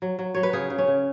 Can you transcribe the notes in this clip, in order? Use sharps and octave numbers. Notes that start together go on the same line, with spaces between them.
F#3
F#3
F#3 C#5
B4
C#3 G#4
C#3
C#4
C#3